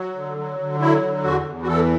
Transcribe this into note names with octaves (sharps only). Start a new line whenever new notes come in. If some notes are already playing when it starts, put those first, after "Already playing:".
Already playing: F#3
D3
F#3
D3
F#3 E4
D3
E2 F#4
E2
F#4
E3 A4